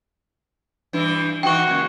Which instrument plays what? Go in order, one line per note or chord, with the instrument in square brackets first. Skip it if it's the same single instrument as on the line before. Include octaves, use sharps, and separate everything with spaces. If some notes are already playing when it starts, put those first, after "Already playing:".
[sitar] G2 E3 E4
[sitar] E3 D#4 [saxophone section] F#4 [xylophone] G5 C#6
[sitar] A#2 C#3 G#3